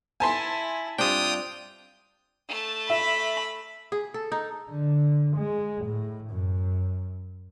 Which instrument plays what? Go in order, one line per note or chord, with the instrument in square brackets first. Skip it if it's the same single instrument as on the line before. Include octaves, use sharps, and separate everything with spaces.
[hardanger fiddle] E4 E5 [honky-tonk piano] G#5 A5 C6
[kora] G2 C4 D4 [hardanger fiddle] F4 [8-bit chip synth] G5 D#6
[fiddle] A3 A5
[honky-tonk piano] E5 [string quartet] B5
[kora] G#4
A4
D#4
[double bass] D3
G#3
A2
F#2